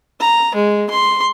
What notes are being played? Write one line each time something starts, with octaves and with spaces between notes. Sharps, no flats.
A#5
G#3
C6